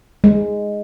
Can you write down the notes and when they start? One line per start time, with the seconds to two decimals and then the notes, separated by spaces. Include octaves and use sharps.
0.24 G#3